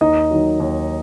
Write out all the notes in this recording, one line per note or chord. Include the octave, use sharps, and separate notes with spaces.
D#2 D#4 D#5
D#3 F#3
D#2